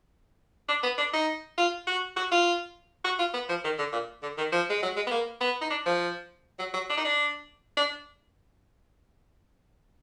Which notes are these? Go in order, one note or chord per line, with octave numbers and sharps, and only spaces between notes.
D4
B3
D4
D#4
F4
F#4
F#4
F4
F#4
F4
B3
F3
D#3
D3
A#2
D3
D#3
F3
G#3
F#3
G#3
B3
A#3
B3
D#4
D4
F3
F#3
F#3
D4
D#4
D4
D4